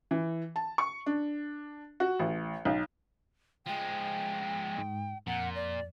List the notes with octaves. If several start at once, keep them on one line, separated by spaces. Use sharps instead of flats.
E3
A5
C#6
D4
F#4
A1
B1
F3 G#3 G5
G#2
F2 A#2 F#5
D5